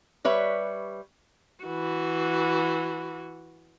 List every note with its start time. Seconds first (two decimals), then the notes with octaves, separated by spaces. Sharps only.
0.25 G3 B4 C#5 E5
1.64 E3 F#4